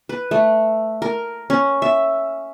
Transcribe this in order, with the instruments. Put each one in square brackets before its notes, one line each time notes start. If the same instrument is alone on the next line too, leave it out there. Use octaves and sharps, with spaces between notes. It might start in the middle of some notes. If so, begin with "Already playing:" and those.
[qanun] B4
A3
A#4
C#4
E5